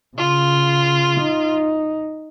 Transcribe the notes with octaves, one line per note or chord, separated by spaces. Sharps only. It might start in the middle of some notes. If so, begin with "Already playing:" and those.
C#3 F4
D#4